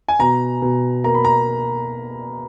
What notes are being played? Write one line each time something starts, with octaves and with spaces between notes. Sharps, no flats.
G#5
B2 A#5
B2
A#3 A#5
B5
A#5